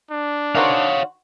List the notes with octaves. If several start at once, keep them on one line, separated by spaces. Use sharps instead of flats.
D4
D#3 F#4 C5 C#5 F5